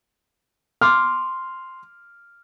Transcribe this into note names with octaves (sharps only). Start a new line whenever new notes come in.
C6 D6 F6